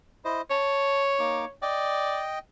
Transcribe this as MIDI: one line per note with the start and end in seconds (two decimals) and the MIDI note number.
0.25 0.41 64
0.25 0.41 72
0.25 0.41 75
0.50 1.53 73
0.50 1.02 81
1.19 1.45 58
1.19 1.45 63
1.19 1.45 86
1.62 2.23 74
1.62 2.39 75
1.62 2.39 79